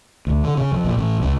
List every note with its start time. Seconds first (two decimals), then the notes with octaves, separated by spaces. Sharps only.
0.27 D2
0.44 D3
0.58 C#3
0.72 F2
0.84 A#1
0.97 A1
1.22 C#2